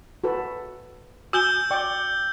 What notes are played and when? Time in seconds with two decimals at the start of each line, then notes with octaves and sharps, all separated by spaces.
0.24 F#4 A4 B4
1.33 F#4 G#5 E6 G6 G7
1.71 D5 G5 C#6